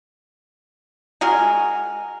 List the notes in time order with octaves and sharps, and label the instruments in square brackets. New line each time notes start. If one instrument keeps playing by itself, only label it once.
[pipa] G#3 F#4 G#4 A#4